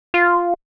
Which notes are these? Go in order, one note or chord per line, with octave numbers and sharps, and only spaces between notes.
F4